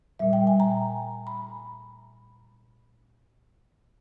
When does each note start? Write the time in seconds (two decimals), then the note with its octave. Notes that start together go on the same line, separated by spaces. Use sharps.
0.19 A#2 G3 E5
0.33 G5
0.47 G#5
0.60 A#5
1.27 B5